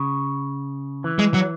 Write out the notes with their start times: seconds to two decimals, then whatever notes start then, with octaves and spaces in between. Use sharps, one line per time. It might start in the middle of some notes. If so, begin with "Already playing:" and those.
Already playing: C#3
1.04 E3
1.19 G#3
1.34 F#3